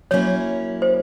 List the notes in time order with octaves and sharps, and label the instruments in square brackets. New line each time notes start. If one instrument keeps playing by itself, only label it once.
[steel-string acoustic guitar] F#3 A#3 C#4 E4 [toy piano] C#5
[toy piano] C5